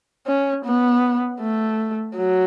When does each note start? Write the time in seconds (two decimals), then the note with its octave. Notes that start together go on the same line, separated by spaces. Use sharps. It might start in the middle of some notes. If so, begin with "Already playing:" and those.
0.26 C#4
0.65 B3
1.40 A3
2.16 F#3